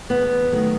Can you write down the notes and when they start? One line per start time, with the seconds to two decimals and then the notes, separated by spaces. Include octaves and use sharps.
0.10 E2 B3
0.52 D#3 F#3 A3